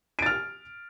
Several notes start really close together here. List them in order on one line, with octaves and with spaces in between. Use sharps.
D7 A6 F6